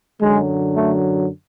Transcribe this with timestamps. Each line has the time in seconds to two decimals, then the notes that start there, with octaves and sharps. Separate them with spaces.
0.21 F#2 D3 F#3 G#3
0.76 A3